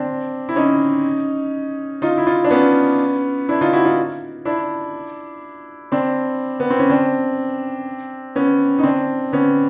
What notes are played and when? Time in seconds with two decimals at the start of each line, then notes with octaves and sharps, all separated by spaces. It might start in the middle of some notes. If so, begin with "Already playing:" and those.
Already playing: C4 D4
0.49 E4
0.56 C#4 D#4
2.02 D#4 F4
2.18 E4
2.26 D#4 F4
2.45 D4
2.51 B3 C#4
3.49 D4 E4
3.61 D#4 F4
3.73 E4 F#4
3.85 D#4 F4
4.45 D4 E4
5.92 C4 D4
6.60 B3
6.70 C4
6.79 C#4
6.90 C4 D4
8.36 B3 C#4
8.79 D#4
8.83 C4 D4
9.33 B3 C#4